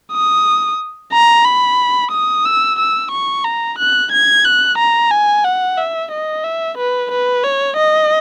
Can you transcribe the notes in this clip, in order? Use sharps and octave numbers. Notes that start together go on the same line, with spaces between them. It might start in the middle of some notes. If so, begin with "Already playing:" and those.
D#6
A#5
B5
D#6
E6
E6
C#6
A#5
F#6
G#6
F#6
A#5
G#5
F#5
E5
D#5
E5
B4
B4
C#5
D#5